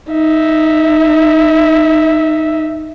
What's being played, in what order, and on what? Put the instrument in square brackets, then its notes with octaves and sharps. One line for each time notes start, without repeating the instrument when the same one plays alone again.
[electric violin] D#4 E5